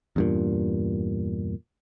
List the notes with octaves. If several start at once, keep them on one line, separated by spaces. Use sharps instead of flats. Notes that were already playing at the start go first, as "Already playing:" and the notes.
E2 G2 A#2